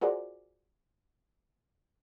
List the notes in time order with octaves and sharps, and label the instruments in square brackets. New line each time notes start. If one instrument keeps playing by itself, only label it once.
[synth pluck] F4 F#4 G#4 A#4 C5 D5